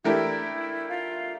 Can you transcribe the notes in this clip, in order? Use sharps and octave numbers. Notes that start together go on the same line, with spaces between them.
E3 A3 D4 E4 G4 A#4
F4